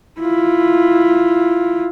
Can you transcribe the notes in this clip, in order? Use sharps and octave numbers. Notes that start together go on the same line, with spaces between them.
E4 F4